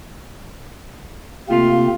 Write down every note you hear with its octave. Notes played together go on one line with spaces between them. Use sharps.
C3 A3 A#3 C4 F4